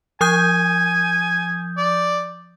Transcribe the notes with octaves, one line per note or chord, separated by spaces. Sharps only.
F3 G#5 D#6 G6
D5